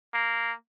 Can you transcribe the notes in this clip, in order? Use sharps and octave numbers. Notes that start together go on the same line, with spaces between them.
A#3